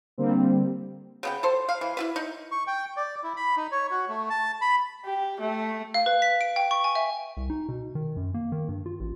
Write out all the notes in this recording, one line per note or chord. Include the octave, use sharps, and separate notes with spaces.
D3 G3 A#3 C4
C#3 B3 G5
A4 C5
F5
E3
E4 F4 B4
D#4
C#6
G5
D5
E4
B5
D#4
C#5
F#4
A3
A5
B5
G4
A3
F5
B4
B6
D7
G5
C#6
G#5
E5
C2
D#4
B2
D#3
F#2
A#3
D#3
G2
F4
A1